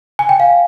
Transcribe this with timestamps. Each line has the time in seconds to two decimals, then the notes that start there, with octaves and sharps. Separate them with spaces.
0.19 G#5
0.29 G5
0.40 F5